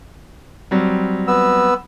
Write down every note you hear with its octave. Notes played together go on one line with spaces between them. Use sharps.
F#3 G3 C4
B3 E6